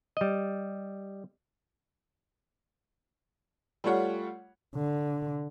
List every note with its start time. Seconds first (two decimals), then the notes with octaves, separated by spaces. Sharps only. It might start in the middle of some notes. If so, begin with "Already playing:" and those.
0.17 G3 D#5
3.84 G3 A3 F4 C#5 F#5
4.76 D3